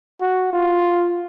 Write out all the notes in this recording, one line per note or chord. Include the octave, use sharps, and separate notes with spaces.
F#4
F4